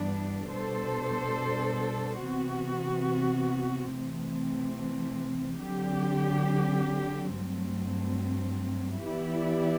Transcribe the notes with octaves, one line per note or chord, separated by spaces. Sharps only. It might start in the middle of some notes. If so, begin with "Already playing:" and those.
Already playing: G2 E3 G3 B3 D4
B2 G3 D4 A4 C5
C3 E3 B3 F#4
C3 E3 A3 C4
D3 F#3 C4 G4
G2 F#3 A3 C4
E3 B3 E4 G4 D5